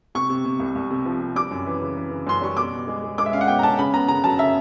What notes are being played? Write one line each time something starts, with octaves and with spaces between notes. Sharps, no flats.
C3 C#6
C3
C3
C2
C2
C3
F3
C3
G3 D6
F#2
E3
C#3
E3
C#3
F#2 C6
G3 C#6
B2 D6
B2
G#3
G#3
G#3 D6
E5
C#4 F5
F#5
B2 G5
A#5
C#4 A5
C#3 B5
B3 A#5
C#3 A#5
F#3 A5
C#3 E5